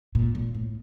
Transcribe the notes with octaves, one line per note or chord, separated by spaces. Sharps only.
A#2
A#2
A2